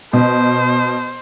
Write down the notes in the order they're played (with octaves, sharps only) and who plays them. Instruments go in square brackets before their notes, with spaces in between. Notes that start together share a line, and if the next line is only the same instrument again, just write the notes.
[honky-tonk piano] B2 [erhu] C5